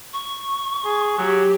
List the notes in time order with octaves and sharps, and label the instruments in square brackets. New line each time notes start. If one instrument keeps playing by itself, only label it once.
[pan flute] C#6
[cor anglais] G#4
[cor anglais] F#3 [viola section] G4